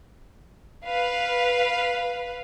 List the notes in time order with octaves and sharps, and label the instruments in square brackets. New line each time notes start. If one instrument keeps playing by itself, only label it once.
[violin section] B4 F5